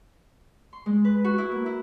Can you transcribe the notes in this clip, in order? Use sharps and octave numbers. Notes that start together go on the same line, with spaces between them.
C6
G#3
B4
F#4
E4
A#3
E4